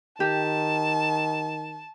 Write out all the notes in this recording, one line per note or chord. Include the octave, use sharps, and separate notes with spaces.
D#3 G4 A5